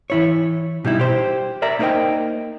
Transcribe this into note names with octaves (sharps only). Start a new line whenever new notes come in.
E3 E4 C#5
B2 G3 D#4 E4
G4 C5
A#4 D5 E5 A#5
A#3 D#4 A#4 C5 D#5 G5